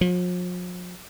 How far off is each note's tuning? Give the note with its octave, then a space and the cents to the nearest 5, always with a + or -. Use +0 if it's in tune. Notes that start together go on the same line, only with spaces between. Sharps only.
F3 +45